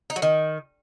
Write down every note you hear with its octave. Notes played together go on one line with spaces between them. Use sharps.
D#4
F#3
D#3